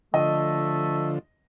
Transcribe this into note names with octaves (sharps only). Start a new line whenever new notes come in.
D3 F3 A3 D#5